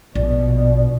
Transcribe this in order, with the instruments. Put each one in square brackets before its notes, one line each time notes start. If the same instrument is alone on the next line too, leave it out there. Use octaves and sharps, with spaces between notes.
[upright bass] A#1 [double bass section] B2 [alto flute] D5